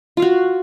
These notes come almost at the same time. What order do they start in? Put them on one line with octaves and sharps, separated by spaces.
F4 F5 F#4